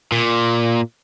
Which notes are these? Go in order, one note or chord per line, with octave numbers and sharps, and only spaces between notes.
A#2